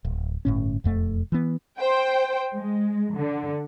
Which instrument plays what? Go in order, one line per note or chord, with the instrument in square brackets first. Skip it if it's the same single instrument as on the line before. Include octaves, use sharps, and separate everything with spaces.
[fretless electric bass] D1
G1 A2 C#4
E1 F2 A3
E3 B3
[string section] C5 G5
G#3
D3